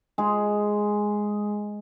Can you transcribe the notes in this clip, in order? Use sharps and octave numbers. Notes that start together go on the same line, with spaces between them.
G#3 G#4